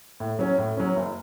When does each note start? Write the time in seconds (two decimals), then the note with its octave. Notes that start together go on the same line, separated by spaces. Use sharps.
0.20 A2
0.39 F#3 C#4
0.58 A2
0.77 F#3 C#4
0.96 F#1